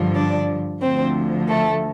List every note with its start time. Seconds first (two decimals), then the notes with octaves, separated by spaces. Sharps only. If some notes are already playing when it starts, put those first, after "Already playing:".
Already playing: G2 D3 F3
0.16 D4 D5
0.82 D2 D3 F3 C4 C5
1.49 A3 A4